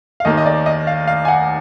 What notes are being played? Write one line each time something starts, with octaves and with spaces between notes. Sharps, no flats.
F5
D#2 D#3 A#3 D#5
D#5
D5
D#5
F5
F5
G#5
F#5